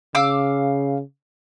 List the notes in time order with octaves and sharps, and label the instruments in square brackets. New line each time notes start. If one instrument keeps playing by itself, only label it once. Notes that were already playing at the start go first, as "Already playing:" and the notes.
[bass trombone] C#3 [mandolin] F5 D6 E6